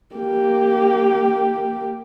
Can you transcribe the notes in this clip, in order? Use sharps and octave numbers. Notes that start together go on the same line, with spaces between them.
A#3 G4